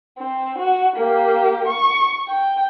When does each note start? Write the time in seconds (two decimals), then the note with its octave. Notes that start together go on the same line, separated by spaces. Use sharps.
0.19 C4
0.59 F#4
0.96 A#3 G4
1.68 C#6
2.28 G5